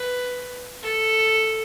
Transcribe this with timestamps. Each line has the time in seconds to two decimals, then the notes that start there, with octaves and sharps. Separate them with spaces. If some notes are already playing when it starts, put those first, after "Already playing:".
Already playing: B4
0.83 A4